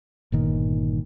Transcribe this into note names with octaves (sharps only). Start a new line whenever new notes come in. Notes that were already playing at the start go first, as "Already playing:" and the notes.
G1 A#2 D#3